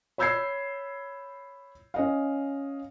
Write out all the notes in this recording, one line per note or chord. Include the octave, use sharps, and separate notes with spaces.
C#5 B5 E6 G6 G#6 C7
C#4 D#5 F5